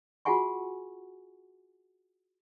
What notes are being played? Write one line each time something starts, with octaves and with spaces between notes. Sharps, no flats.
F4 F#4 G#4 F#5 G#5 C#6